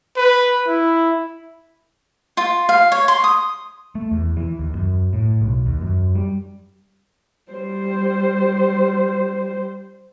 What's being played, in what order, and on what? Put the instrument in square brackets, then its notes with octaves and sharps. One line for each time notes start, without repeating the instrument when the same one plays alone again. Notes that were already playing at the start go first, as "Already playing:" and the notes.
[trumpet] B4
E4
[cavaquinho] F4
F5
C#5
C6
D#6
[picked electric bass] A3
E2
E3
D#2
F#2
A2
B1
D#2
F#2
G3
[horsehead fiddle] G3 C5